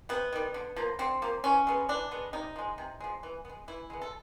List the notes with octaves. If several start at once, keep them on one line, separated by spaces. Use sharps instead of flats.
C3 B3
D#3 G3
D3
F3 A#3
D3 C4
F3 A#3
E3 C#4
G#3 B3
E3 D4
G#3 B3
C3 D#4
F3 G#3
C3
F3 G#3
E3
B3
G#3
E3 E4
G#3 B3
A4